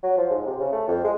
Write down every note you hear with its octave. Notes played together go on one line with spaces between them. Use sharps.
F#3
F3
G#2
C3
C#3
A3
F2
G#3